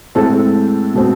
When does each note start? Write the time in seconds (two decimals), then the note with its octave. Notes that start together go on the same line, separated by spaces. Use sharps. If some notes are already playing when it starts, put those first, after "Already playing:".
0.15 A2 G#3 C4 A4 A5
0.94 B2 A3 C4